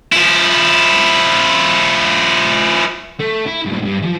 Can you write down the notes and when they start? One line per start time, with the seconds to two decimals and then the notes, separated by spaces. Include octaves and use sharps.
0.12 F3 E4
3.19 A3
3.46 E4
3.65 G2 A#2
3.85 G2
4.02 E3 F3